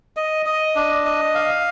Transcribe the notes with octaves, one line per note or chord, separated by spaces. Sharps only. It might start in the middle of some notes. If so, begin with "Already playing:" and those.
D#5
D#5
D4
D#5
F5